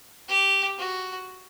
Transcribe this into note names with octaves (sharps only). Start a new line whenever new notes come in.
G4
F#4